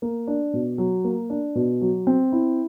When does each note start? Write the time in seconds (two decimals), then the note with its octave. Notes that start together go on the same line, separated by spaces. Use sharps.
0.02 A#3
0.27 D4
0.53 B2
0.78 F#3
1.04 A#3
1.30 D4
1.55 B2
1.81 F#3
2.07 C4
2.32 E4